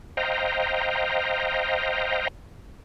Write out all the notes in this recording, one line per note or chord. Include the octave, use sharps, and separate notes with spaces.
C5 D#5 F5 G5 A#5